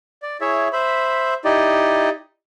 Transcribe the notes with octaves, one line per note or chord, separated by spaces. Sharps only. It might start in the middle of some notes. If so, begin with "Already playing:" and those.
D5
E4 G#4 C#5 E5
C5 E5 B5
D#4 E4 G4 D5 D#5